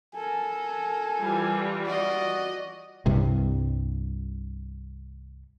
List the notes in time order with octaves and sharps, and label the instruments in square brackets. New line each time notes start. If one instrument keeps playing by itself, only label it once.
[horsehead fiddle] A4 A#4 [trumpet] G#5
[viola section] E3 G3 F4
[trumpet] F#4 [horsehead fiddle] D5 D#5
[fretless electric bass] C2 G2 C3